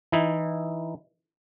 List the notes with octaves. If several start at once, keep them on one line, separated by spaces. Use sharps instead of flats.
E3 D#4 E4